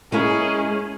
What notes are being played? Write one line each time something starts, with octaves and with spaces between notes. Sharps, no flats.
G#3 C#4 E4 G#4 A#4